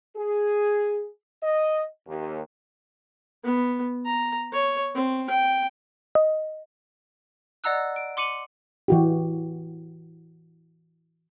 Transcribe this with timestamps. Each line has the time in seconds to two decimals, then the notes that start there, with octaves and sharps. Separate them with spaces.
0.17 G#4
1.43 D#5
2.07 D#2
3.44 B3
4.06 A#5
4.53 C#5
4.95 C4
5.30 G5
6.15 D#5
7.64 D5 D#5 F#5 A#5 E6 F#6
7.96 D7
8.17 C6 D6 C#7 D#7 F#7
8.88 E3 F#4 G4